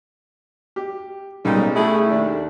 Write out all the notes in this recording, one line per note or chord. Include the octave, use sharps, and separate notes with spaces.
G4
B1 C#3 G3 G#3 A#3 D#4
A3 E4 G4 G#4
D#2 D4